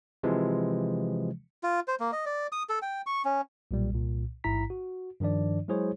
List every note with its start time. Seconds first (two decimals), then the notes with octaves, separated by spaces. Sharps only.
0.23 C3 E3 F3 G#3
1.63 F4
1.88 C5
2.00 A#3
2.12 D#5
2.26 D5
2.52 D#6
2.69 A4
2.82 G5
3.07 C#6
3.25 C#4
3.71 B1 A#2 G3
3.92 C2 A#2
4.44 A1 G#2 E4 A#5 B6
4.70 F#4
5.20 G2 D#3 F3 D4 D5
5.68 F#3 G#3 E4 G#4 C5 C#5